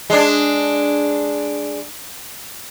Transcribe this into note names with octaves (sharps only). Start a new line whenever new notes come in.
G#3 D4